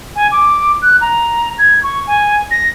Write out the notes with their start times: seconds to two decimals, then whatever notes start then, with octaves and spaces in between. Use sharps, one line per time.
0.16 G#5
0.32 D6
0.82 F#6
1.01 A#5
1.58 G#6
1.83 C#6
2.07 G#5
2.51 A#6